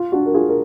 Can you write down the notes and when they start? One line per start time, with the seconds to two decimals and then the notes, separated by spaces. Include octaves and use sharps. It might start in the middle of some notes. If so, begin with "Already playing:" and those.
Already playing: F4
0.12 D4 F#4
0.26 A#4
0.34 F4 G#4
0.49 A#4